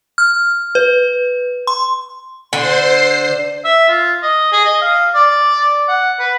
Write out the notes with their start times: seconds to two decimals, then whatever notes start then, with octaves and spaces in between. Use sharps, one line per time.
0.18 F6
0.75 B4
1.67 C6
2.53 D3 C5 C6
3.64 E5
3.89 F4
4.22 D#5
4.52 G#4
4.65 D#5
4.81 F5
5.14 D5
5.89 F#5
6.19 B4